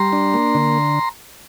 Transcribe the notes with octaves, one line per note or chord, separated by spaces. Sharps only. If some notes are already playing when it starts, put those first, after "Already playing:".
Already playing: G3 A#5 C6
D4
A#3
D3